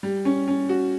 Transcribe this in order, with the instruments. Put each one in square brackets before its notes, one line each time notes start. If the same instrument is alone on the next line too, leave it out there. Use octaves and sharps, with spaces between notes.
[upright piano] G3
C#4
C#4
F#4